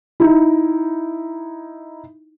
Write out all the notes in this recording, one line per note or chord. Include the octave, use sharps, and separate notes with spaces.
D#4 E4